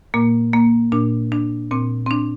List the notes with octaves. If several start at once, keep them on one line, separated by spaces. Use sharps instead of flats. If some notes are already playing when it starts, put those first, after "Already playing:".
A#2 A#3
A#3
A#2 D4
D4
A#2 C4
C4
D4